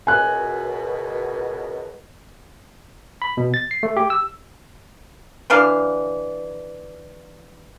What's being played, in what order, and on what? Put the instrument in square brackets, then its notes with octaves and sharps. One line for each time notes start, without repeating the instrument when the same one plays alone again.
[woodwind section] C#2 F#2 B2 [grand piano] G#5 F#6
[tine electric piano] B5
B2
A6
C7
A3
G4
E6
[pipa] D3 E3 D4 F5